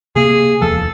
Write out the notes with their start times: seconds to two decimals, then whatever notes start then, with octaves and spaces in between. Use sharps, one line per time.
0.16 C3 A#3 G#4
0.62 D1 E2 F3 A4